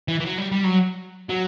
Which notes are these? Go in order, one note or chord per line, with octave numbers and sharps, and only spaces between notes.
E3
E3
F#3
G3
G3
F#3
F#3